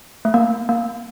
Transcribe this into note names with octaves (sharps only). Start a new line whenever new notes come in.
A3
A#3
A#3